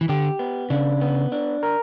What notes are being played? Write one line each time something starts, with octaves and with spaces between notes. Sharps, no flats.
E3
D3 G4
B3
C#3 D4
B3
D4
A#4